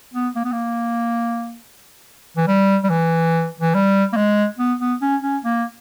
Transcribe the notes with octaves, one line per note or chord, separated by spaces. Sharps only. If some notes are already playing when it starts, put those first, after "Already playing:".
B3
A#3
B3
A#3
E3
G3
G3
E3
E3
G3
A#3
G#3
B3
B3
C#4
C#4
A#3